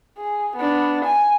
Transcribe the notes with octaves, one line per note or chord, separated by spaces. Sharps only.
G#4
B3 D4
G#5